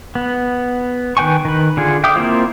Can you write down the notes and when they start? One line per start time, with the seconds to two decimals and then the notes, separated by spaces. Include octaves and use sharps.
0.15 B3
1.17 D#3 B4 G5 G#5 C#6
1.45 D#3 B4
1.77 D3 F4 G#4
2.04 E5 F5 G5 D6 D#6
2.16 A#3 C4 E4 F4 C5